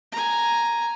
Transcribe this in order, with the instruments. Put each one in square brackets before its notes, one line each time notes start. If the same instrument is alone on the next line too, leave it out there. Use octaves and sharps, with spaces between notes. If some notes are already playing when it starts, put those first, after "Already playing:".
[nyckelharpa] G#5 A#5